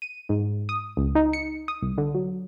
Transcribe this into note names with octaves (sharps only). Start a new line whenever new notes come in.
D#7
G#2
D#6
C#2
D#4
C#7
D#6
C2
D3
F#3